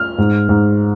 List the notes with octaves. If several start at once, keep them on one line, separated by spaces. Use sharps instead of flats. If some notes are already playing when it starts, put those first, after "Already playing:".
Already playing: F6
G#2
G#2